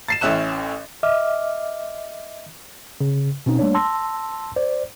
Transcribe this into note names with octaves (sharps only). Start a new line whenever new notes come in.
A6 C7 E7
A1 A2 C#4 E5 F#6 E7
D#5 E5 D6 F6
C#3
B2 C4 C#4 D#4
G3 A3 A#3 D4 C#5
A5 C6 E6 A#6
C5 D5